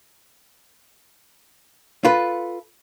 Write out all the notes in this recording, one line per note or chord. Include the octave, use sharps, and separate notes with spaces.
F4 A4 B4